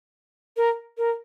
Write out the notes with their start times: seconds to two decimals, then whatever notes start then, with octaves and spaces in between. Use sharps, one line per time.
0.57 A#4
0.98 A#4